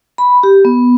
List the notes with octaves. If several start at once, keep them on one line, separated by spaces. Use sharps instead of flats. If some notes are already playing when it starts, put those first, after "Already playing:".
B5
G4
B3